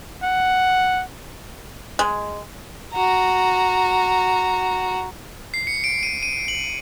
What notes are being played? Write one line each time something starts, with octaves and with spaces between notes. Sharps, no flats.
F#5
G#3
F#4 A#5
C7
C#7
D7
D#7
D#7
F#7